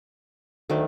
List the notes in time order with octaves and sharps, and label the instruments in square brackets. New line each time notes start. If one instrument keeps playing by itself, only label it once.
[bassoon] D2 [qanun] D#3 F#3 A3